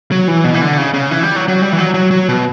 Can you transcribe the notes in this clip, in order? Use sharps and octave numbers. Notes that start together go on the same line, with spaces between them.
F#3
E3
B2
E3
D3
C#3
C#3
E3
G3
F#3
F#3
G3
E3
F#3
F#3
F#3
B2